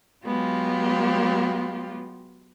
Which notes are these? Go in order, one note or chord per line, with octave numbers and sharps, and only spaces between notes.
F#3 G#3 B3 F4 G4